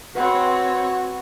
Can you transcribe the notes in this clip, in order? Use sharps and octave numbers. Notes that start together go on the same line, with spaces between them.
C4 F#4 B4 C#5 F#5